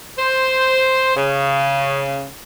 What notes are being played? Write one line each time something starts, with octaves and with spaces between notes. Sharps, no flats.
C5
C#3